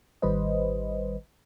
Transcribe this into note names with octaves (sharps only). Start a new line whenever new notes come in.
G#1 D#3 G3 B4 C5 D#5